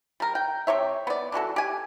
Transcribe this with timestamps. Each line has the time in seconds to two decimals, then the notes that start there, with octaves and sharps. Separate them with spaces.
0.20 G3 A#4
0.35 G5
0.67 C3 G4 C#5 E5
1.07 B3 D5
1.32 D3 E3 F#4 A4
1.56 G4 G#5